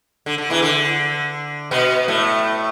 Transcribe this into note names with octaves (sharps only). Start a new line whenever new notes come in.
D3
D3
E2 E3
D3
B2 B3
A2 A3